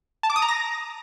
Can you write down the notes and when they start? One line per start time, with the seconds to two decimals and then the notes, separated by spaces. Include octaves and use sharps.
0.23 A5
0.30 D6
0.36 D#6
0.42 A#5
0.48 A#6